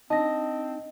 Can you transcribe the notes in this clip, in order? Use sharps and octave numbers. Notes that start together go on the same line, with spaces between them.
C4 D4 D#4 D#5 A5 A#6